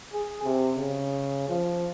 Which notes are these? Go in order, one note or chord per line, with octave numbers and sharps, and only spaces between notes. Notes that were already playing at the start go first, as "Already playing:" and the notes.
G#4
C3
C#3
F3